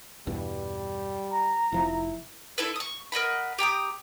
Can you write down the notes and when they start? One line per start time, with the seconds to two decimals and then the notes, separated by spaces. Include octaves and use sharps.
0.27 E2 G2 B2 G3
1.31 A#5
1.72 F1 F3 E4
2.58 D4 E4 A4 B4
2.76 C#6 D#6
3.12 A#4 D#5 F#5 B5
3.58 G4 G5 A#5 D#6